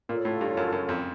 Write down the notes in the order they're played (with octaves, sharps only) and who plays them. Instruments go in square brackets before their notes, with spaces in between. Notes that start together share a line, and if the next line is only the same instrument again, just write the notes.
[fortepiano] A#2 [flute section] F4 A4 C#5
[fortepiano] A2
G2
F#2
F#2
F2